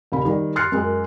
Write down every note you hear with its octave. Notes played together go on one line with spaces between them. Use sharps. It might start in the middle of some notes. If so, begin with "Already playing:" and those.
D#2 C#3 B5
D#3 G3
C6 F6 F#6 A6 C7 C#7
F#2 G#3 A#4